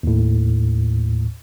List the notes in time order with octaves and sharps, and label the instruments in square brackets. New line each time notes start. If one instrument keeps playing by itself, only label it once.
[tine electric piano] D#2 A2